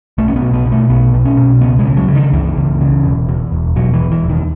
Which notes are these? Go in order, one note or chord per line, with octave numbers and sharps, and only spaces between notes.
B1 A3
C#4
B3
B2
B3
B2
A3
B1 B3
B1
C#4
B2
C#2 B3
G#3
C#3
F#3
C#3
D#3
C#2 E3
C#2
C#3
E1
E2
E1
B2 F#3
E3
E1
E3
E2
D#3